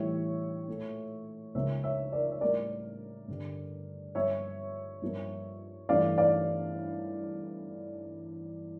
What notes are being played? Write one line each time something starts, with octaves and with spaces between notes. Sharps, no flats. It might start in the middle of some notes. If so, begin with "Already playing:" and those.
Already playing: A2 E3 G3 C#5 E5
A#2 A3
C#2 C#3 F3 A#3 C#5 E5
C#5 E5
A#4 D5
E5
A2 G3 A#3 A#4 D5
G2 D3 G3
G2 F3 A#3 C#5 E5
G2 F3 A#3
G2 E3 A3 D5 F5
D5 F5